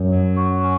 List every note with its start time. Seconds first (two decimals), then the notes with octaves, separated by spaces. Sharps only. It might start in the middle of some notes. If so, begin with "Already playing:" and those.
Already playing: F#2
0.11 F#3
0.36 F#4
0.63 C#4